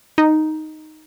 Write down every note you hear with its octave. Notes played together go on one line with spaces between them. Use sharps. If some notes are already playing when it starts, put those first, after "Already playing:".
D#4